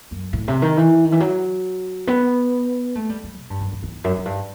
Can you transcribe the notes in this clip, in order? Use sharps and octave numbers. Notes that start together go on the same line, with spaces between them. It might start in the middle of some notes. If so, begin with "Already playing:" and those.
F#2
A2
C3
D#3
E3
D#3
E3
F#3
B3
A3
G3
G3
B2
G2
F#2
F#2
E2
F#2
F#2
G2